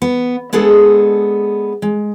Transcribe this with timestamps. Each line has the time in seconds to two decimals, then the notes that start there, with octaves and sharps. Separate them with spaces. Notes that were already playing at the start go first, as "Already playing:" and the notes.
0.02 B3
0.53 G#3 B3 D4 G#4 A4
1.82 G#3